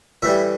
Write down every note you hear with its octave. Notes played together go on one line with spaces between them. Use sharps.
A2 E3 G3 E5